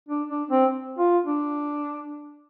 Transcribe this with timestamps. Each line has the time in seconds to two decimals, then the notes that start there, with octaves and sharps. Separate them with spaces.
0.09 D4
0.29 D4
0.51 C4
0.98 F4
1.26 D4